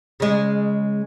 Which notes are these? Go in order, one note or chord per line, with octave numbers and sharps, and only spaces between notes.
C#3 G#3